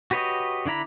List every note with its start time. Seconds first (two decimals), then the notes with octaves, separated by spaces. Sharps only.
0.11 F#4 G4 B4 C#5 D#5
0.65 D3 D4 E4 A#5 B5